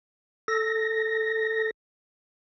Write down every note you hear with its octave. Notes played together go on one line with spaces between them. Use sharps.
A4 A#6